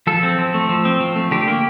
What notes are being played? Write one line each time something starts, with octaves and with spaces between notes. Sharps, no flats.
F3 A4
C4
F3
A3
F3
C4
F3
A3
D3 G4
A#3